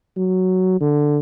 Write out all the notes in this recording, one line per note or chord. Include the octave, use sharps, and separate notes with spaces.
F#3
D3